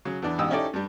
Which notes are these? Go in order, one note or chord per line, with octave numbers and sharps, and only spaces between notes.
C#3 F#3
E2 E3 D4
A1 G#2 B2 G4 D#6 E6
C#4 D#4 E4 G4 A4 D5
G2 G3